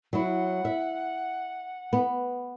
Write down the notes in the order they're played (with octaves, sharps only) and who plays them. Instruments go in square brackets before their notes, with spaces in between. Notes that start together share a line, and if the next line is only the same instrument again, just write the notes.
[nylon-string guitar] F#3 E4 [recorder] F#5
[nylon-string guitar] E5
B3